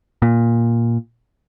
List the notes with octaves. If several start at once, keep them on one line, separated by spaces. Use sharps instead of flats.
A#2